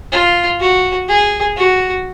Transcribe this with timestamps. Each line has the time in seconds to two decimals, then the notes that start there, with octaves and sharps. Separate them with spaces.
0.12 F4
0.60 F#4
1.08 G#4
1.57 F#4